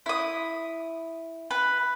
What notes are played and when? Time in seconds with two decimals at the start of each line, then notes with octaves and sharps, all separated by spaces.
0.06 E4 D#6
1.51 B4